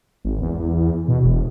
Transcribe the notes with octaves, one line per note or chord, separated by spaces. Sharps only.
G#1
E2
E2
B2
E1